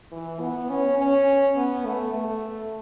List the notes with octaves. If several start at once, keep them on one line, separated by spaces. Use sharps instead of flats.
E3
B3
C#4
C#4
B3
A3
A3